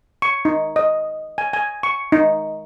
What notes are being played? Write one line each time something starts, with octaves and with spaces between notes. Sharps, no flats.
C#6
D#4
D#5
G#5
G#5
C#6
D#4